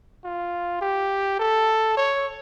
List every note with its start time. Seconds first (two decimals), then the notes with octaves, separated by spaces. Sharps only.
0.25 F4
0.81 G4
1.40 A4
1.97 C#5